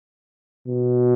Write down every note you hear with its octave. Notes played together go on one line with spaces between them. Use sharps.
B2